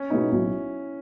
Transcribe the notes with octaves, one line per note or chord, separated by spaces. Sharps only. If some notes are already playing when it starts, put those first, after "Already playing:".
Already playing: C#4
B2 G#3 B3 D#4 E4
B1 E4